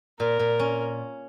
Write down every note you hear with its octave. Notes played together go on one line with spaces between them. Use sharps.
A#2 A#4
A#2
C#4